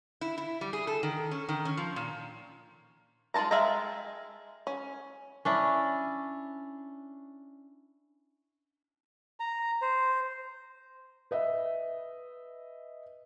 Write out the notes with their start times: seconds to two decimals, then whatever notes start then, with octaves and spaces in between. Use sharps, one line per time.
0.21 E4
0.38 E4
0.61 G3
0.73 G#4
0.87 A4
1.03 D#3
1.31 C#4
1.49 D#3
1.65 C#4
1.77 F3
1.96 A#2
3.34 G#3 D#4 F4 A5 A#5
3.51 G#3 E5 F5 G5 A#5
4.67 C#4
5.45 C#4 D4 E4
9.40 A#5
9.82 C5
11.31 B4 D#5 E5